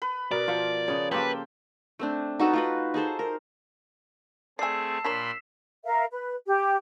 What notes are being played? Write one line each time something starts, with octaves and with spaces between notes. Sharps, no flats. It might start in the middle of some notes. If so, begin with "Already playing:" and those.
B4
B2 A#4 D5
F3 F4 E5 F#5
C#3 B3 C#5
A#3 G4 A4 B4 C5 G5 A5
A3 C4 D4
D#4 F#4 A4 B4
F4 F#4 B4
D#4 G#4 A4 C5
A#4
A3 C4 G#4 D5 G#5 A5 E6 C7
A#2 D4 A#4 C#5 B5 C6 B6 E7
A#4 E5 F5
B4
G4